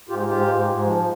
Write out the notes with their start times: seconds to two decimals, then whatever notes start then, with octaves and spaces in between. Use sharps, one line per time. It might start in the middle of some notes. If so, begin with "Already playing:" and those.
0.09 G#2 F4 G4
0.28 G#2 F4 G4
0.47 G#2
0.67 G#2
0.85 F3